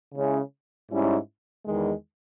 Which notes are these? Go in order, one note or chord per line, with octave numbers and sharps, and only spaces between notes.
C#3 G#3 C#4 E4
G#2 G3 C#4 E4
E2 D#3 G#3